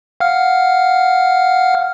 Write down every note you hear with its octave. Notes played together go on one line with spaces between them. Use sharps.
F5 F#5 F6